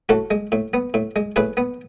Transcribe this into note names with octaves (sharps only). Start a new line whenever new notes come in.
A2 F#4 A4
G#3
A2
B3
A2
G#3
A2 G#4 B4
B3